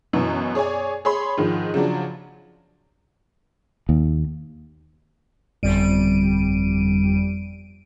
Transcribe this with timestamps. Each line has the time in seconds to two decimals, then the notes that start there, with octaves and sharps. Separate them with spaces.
0.13 F#2 B2 E3 F#3
0.55 G#4 C#5 D5 G#5
1.05 G#4 C#5 B5 C6
1.38 G#2 D#3 F3
1.74 C#3 F3 F#3 D4
3.89 D#2
5.63 G1 F2 G3 D7 D#7